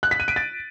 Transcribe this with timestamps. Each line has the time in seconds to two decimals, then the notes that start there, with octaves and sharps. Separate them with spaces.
0.03 F#6
0.11 B6
0.20 D#7
0.28 D7
0.36 A6